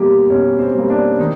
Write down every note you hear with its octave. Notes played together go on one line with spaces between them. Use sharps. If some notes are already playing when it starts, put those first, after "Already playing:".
Already playing: B2 G3 A#3 G4
B2 C#4
C4
G3 A#3
D4
D#3 D#4